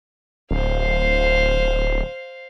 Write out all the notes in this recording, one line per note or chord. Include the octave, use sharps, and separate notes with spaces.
D1 C5 F5